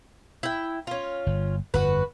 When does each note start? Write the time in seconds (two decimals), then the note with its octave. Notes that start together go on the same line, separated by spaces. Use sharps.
0.43 E4 G5
0.87 C#4 F4
1.26 G1
1.74 G1 F2 D3 F#4 B4